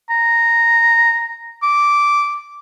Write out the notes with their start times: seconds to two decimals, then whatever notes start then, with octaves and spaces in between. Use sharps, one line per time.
0.10 A#5
1.63 D6